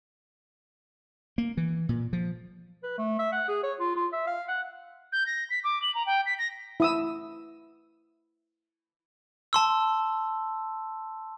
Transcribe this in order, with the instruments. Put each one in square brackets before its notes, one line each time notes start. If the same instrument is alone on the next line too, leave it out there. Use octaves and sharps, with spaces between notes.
[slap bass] A#3
E3
A#2
F3
[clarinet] B4
A3
E5
F#5
G#4
C#5
F4
F4
E5
F5
F#5
[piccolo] G6
A#6
B6
D6
F#7
A#5
G5
B6
A#6
[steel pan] E4 D#6 E6
[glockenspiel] A5 C6 E6